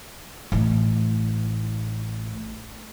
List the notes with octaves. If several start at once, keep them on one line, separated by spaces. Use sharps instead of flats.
A1 A3